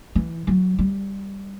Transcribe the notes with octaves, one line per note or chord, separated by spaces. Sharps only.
E3
F#3
G3